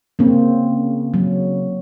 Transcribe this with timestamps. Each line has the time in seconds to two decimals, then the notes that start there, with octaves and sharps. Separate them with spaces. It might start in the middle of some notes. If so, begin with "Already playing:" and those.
0.19 C#3 A#3 C4
1.14 F#3